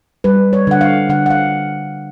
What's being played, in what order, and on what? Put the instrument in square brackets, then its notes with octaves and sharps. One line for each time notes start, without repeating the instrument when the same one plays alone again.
[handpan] G3 B4
C#5
D3 F#5
F5
D3 F#5
F#5
F5